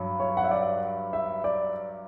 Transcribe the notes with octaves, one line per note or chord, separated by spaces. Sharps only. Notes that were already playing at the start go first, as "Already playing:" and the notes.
Already playing: G2 F#3
C#5
F#5
E5
D5
E5
D5